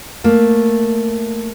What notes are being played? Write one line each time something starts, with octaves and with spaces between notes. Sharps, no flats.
A3 A#3